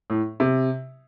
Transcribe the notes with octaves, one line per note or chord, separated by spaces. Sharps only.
A2
C3